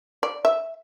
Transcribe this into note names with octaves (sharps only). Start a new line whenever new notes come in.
D5
E5